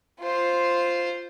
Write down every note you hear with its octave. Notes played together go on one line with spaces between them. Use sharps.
F4 C5